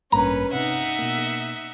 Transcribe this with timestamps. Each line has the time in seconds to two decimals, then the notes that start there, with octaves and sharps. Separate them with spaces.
0.12 A1 G2 A#3 C#4 B4 A#5
0.53 C3 D#4 E5 F#5
0.99 B2 A#3